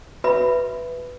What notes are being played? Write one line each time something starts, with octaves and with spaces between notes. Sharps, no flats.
F#4 B4 E5 B5